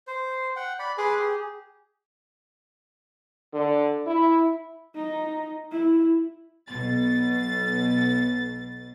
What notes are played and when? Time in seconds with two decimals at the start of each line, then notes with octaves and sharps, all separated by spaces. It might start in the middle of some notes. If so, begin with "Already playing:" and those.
0.07 C5
0.56 F#5 G5
0.79 D5 B5
0.98 G#4 B4 C6 D6
1.19 G4
3.54 D3
4.07 E4
4.96 D#4
5.72 E4
6.69 B1 B2 A6